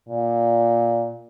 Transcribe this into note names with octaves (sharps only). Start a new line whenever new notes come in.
A#2